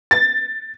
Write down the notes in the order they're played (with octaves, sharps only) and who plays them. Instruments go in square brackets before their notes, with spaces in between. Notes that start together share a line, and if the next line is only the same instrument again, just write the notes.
[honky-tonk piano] A6